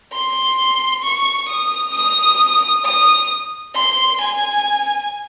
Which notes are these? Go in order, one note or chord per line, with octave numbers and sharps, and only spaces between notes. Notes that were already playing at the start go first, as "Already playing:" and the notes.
C6
C#6
D#6
D#6
D#6
C6
G#5